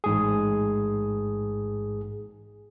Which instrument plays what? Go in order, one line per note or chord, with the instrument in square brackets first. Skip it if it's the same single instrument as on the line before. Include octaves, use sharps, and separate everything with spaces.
[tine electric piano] A1 G#2 G#4